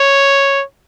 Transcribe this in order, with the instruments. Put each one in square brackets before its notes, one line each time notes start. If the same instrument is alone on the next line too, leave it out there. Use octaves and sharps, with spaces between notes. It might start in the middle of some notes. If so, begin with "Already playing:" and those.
Already playing: [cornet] C#5